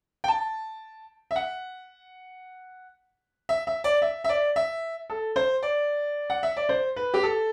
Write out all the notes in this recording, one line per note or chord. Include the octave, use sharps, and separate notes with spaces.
G5
A5
E5
F#5
E5
E5
D5
E5
E5
D5
E5
A4
C5
D5
F#5
E5
D5
C5
B4
G4
A4